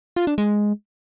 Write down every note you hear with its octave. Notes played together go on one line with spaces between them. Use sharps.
F4
D4
G#3